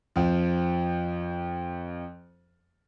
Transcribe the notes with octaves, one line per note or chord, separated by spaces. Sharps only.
F2 F3